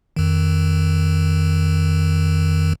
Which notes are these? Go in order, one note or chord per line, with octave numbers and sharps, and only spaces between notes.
F2 D#3